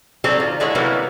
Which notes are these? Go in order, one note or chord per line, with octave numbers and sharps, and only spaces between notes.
F#3 G3 C4 G4 A4
D#3 F4
D3 G#3 E4 A4 C#5
C3 E3 F#3 G3 A#3 B3